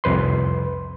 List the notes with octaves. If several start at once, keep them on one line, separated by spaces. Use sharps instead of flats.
C2 F2 B4 C6